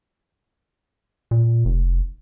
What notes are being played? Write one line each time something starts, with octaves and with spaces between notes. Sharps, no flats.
A#2
F1